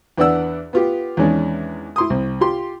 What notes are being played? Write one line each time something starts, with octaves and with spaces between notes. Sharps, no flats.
E2 B3 D4 D5 F#5 E6
B3 F4 G4
E2 D#3 G#3 C#4 D4
E4 C6 D#6
C2
F4 G4 C6